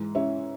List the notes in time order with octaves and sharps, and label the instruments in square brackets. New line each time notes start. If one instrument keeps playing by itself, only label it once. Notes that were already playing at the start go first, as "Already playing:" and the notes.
Already playing: [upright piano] G#2 E3 G#3
C#4 E4